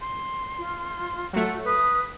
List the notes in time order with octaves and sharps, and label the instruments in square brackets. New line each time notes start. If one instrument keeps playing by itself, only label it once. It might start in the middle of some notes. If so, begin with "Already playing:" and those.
[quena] C6
[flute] F4
[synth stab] F#3 A3 [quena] F#5
[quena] B4 [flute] D#6